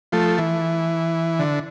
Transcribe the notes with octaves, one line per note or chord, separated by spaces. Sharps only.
F3 A3
E3
D3